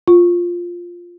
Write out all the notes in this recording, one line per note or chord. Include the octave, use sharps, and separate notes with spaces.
F4